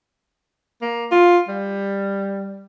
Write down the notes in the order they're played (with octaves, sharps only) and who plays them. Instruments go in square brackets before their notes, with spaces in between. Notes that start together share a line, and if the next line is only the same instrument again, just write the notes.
[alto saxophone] A#3
F4
G3